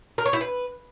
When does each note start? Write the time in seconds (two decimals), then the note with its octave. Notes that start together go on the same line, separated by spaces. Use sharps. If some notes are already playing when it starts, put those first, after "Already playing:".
0.18 A#4
0.26 C#5
0.33 E4
0.41 B4